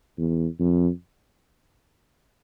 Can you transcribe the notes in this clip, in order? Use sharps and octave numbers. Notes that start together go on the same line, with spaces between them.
E2
F2